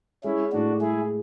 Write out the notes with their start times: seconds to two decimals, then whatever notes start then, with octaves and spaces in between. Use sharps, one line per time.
0.24 G#3 C#4 E4
0.52 A2 D4 F#4
0.81 G#3 E4 G#4